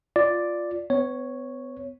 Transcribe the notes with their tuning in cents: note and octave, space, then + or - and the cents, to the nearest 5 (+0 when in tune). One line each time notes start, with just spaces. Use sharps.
F4 +0 D5 +0
B3 +40 C#5 +0